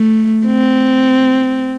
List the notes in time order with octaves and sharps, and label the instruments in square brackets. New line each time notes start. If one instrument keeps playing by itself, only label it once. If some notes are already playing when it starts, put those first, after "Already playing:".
Already playing: [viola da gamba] A3
C4